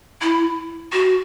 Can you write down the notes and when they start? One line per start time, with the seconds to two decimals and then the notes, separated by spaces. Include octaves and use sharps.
0.22 E4
0.92 F#4